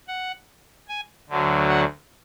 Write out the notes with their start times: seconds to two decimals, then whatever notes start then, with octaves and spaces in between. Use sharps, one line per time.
0.08 F#5
0.89 G#5
1.29 D2 D3 F#3
1.69 F#5